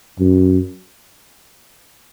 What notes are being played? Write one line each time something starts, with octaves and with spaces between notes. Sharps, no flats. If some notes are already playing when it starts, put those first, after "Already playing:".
F#2